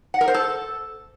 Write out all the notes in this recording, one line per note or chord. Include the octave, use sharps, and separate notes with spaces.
F#5
A#4
C5
A4